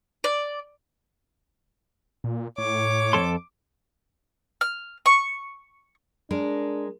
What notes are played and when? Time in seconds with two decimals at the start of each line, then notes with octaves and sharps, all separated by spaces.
0.24 D5
2.24 A#2
2.58 A2 C#5 D6
3.13 F2 A4 C6
4.61 F6
5.06 C#6
6.31 G#3 D4 A#4